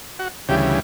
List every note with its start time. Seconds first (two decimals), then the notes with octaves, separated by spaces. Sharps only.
0.19 F#4
0.49 D2 C#3 E3 G3 G4